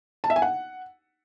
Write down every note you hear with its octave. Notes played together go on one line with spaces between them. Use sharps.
A5
E5
G#5
F#5